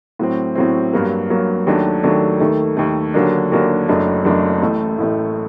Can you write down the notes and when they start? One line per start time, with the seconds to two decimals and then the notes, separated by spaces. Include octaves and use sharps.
0.19 A2 F#3 C4
0.55 A2 F#3 C4
0.93 G2 F#3 A#3
1.30 G2 F#3 A#3
1.67 D#2 D#3 F#3 A3 D4
2.03 D#2 D#3 F#3 A3 D4
2.40 D#2 D#3 A3
2.77 D#2 D#3 A3
3.14 D#2 D3 F#3 A#3 D4
3.52 D#2 D3 F#3 A#3 D4
3.88 F#1 F#2 F#3 A3 D4
4.25 F#1 F#2 F#3 A3 D4
4.62 A1 A2 A3
4.98 A1 A2 A3